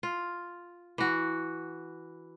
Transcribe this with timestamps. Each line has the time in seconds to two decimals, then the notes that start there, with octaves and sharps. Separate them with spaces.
0.03 F4
0.98 E3 F#4